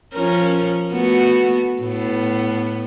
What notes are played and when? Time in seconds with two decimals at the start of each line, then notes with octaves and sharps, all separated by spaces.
0.14 F3 C#4 A#4
0.92 A3 B3 F#4
1.82 A2 B3